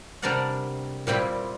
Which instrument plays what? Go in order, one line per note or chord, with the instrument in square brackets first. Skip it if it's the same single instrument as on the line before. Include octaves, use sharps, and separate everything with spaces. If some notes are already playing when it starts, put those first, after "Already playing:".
[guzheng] C3 G3 D4 A#4 D5 F#5
A#2 G3 C4 E4 G4